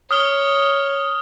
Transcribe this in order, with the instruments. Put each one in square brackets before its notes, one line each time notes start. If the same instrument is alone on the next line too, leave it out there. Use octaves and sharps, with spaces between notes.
[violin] C#5 [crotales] D#6 F6 G7